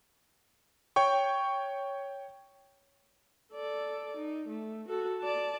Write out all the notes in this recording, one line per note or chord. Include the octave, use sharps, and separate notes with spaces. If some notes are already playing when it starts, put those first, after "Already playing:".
C#5 G5 C#6
A4 D5
D#4
A3
F#4 A4
D5 A5